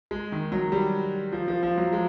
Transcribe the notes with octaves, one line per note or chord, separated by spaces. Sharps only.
G#3
D#3
F#3
G3
F3
F3
F3
F#3
G#3